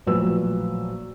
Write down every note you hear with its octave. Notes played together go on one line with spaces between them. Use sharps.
A1 A#2 F3 F#3 B4 E6